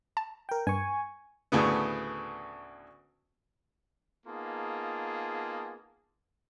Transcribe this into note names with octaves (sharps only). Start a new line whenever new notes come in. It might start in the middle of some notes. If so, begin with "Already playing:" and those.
A5
A#4 G5
G2 G#5 C#6
D2 A2 C#3 B3
A#3 B3 D#4 F4 G#4 A5